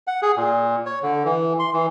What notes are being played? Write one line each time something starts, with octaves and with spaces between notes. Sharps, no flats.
F#5
G#4
A#2
C#5
D3
E3
C6
E3